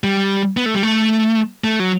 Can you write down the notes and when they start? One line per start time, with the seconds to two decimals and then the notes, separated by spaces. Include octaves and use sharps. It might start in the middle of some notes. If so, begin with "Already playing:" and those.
0.04 G3
0.57 B3
0.66 A3
0.74 G3
0.83 A3
1.64 A3
1.80 F#3